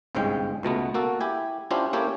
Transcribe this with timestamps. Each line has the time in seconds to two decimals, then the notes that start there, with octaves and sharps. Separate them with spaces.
0.15 G1 C2 G#2 G#3 C#4 G5
0.63 C#2 B2 A3 B3
0.94 A#3 F#4 A4
1.21 E4 G4 G#5
1.71 C#4 D4 E4 F4 G4 C5
1.93 A#3 C#4 E4 G4 A4 C#5